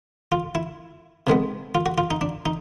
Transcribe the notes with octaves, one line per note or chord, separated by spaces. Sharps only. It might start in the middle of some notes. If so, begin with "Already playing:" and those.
F4
E4
C3 D#3 G#3 B3
F4
F#4
F4
D#4
D4
D#4